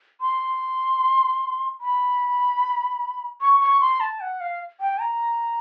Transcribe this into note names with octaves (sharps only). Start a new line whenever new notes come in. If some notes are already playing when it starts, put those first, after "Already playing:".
C6
B5
C#6
C#6
C6
A5
F#5
F5
G5
A#5